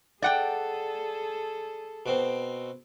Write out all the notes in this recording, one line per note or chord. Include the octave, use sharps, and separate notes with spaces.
G#4 A4 D5 F#5 G5
B2 C4